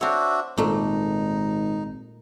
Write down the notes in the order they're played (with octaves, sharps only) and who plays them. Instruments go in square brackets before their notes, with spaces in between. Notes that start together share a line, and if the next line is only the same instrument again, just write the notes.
[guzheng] C4 C#5 [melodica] D4 F#4 E5
[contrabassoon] G#1 [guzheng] A#2 A3 [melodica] D#4